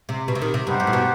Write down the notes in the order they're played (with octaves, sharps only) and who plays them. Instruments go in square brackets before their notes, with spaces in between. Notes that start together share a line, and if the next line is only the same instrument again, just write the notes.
[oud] C3
B2
C3
D#3
C3
[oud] G2 [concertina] B3 D#4 G4 C5 F#5
[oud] G2
A2
B2